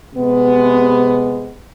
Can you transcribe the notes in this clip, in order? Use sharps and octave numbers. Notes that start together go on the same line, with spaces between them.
C3 G#3 B3